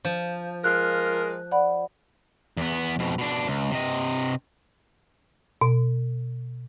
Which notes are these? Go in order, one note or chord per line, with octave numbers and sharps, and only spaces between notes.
F3
G#3 F4 A#4 F#6
D5 F#5 B5
E2 B3
F2 B2
B2 D4
C#2
C3 D#5
B2